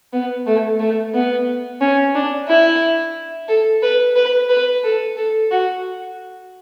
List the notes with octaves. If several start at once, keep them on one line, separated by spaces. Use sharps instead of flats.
B3
A3
A3
B3
C#4
D4
E4
A4
B4
B4
B4
A4
A4
F#4